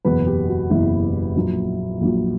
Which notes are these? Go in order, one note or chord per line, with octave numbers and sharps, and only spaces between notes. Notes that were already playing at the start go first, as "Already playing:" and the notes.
F#1 E2 B2 F#3 B4
G4
F#4
F#1 E2 B2 F#3 E4
A#1 A#2 F#3
A#1 A#2 F#3